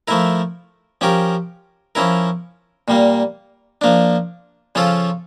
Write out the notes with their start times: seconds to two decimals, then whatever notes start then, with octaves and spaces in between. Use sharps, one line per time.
0.08 F3 A3 E4 A#4
1.01 F3 C#4 G4 A#4
1.95 F3 C#4 E4 A#4
2.88 A#2 G3 A#3
3.81 F3 A#3 D4
4.75 C#3 F3 C#4 F4 A4